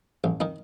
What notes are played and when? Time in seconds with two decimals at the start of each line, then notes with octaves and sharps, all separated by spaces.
0.24 A1
0.40 D#3 D#4